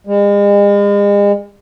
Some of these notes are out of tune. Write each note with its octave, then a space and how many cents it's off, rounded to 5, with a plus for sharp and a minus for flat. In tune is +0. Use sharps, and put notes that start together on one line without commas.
G#3 -40